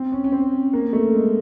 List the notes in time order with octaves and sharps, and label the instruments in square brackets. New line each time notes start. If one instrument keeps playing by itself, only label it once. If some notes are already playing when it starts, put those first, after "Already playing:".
Already playing: [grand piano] C4
C#4
C#4
C4
A#3
A3
G#3